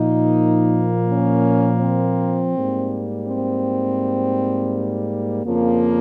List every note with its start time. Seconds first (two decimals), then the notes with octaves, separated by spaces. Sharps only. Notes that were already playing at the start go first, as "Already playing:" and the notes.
Already playing: A#2 F3 A#3 D#4
1.09 C#4
1.81 C4
2.54 G#2 G3 A#3
3.26 C4
5.45 F2 C#3 F3 A#3